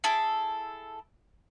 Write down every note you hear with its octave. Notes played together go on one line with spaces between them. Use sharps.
E4 G#4 A4